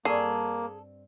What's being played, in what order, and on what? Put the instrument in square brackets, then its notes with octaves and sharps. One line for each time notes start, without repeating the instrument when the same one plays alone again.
[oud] G2 C4 D5 [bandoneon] A#3 [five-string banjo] G#4 [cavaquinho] A4 C#6